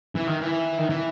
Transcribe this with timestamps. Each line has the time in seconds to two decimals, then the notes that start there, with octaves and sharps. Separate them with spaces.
0.15 E3
0.27 D#3
0.41 E3
0.78 D#3
0.90 E3